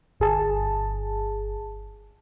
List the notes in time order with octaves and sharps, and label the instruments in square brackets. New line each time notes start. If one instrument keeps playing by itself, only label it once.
[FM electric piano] G1 G#4 A5